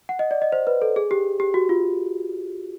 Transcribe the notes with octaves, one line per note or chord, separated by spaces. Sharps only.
F#5
D#5
D5
D#5
C5
B4
A4
G#4
G4
G4
F#4
F4